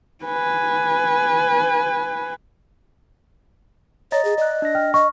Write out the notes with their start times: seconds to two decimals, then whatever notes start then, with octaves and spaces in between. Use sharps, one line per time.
0.24 B4 G#5
4.12 C#5 D#5 A#5 A6
4.25 G#4
4.38 D5 D#5 F#6
4.62 D4 A#6
4.75 G5 F6
4.94 D#5 C#6